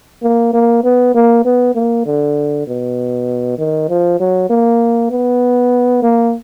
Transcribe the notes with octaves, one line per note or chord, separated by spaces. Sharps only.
A#3
A#3
B3
A#3
B3
A#3
D3
B2
D#3
F3
F#3
A#3
B3
A#3